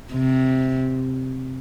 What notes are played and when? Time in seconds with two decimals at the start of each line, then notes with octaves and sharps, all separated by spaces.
0.12 C3